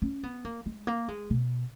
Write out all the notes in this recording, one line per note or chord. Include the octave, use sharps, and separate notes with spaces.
C#4
B3
A#3
G#3
A#3
G#3
B2